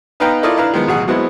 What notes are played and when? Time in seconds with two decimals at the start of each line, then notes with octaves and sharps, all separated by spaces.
0.20 B3 D#4 B4 F5 G5 A#5
0.43 E4 F4 A4 A#4 D5 D#5
0.57 D4 E4 B4 F5 A#5
0.74 D#3 F3 G#3 B3
0.88 A1 B2 F#3 G#4 F#5
1.08 F#3 G#3 B3 C4 E4